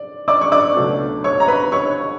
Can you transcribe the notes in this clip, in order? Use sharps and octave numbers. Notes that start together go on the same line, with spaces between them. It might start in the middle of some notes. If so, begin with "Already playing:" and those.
Already playing: D5
D5 D6
C#6
D5 D6
C#2 B2 F#3 A3 D4
C#5 C#6
A#5
B4 B5
C#5 C#6